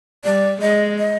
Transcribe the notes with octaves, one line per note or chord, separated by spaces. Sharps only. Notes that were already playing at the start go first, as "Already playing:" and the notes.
G3 D5
G#3 D#5
D#5